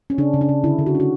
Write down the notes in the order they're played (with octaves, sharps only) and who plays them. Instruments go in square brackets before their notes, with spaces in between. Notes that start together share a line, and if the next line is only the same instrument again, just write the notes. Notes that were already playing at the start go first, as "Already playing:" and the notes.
[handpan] C#4
C#3 D4
C#3
D4
C#3
D3 E4
D3
F#4
C#4
F#4